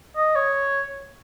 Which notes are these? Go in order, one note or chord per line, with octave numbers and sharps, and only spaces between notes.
D#5
C#5